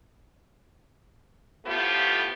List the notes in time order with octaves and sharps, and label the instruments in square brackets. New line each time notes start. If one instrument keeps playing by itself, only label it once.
[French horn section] A2 F3 A3 B3 F4 G4